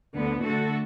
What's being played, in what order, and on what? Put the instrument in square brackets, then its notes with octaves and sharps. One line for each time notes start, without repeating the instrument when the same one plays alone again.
[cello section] D2 D3 B3
D3 A3 F#4 A4